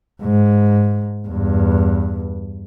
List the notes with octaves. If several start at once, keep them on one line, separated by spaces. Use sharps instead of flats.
G#2
E2 G2